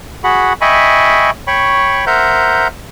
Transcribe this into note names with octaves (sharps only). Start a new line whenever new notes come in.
F#4 G#4 F#5 B5
D#5 E5 G5 G#5 B5 C#6
C#5 G5 B5 C#6
A#4 C5 E5 F#5 A#5 G6